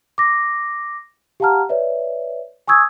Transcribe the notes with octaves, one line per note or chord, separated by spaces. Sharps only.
D6 A#6
G4 F5 F#5 A5 A#5 F6
B4 C#5 D5 E5
G#5 C#6 D#6 E6 G#6